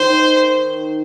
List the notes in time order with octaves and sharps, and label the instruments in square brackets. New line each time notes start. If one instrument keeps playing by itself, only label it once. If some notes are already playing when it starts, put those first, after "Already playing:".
Already playing: [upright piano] D#3 [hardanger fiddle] C5